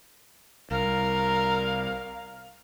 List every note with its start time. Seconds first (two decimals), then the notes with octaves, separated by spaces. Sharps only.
0.71 C2 A#4 F5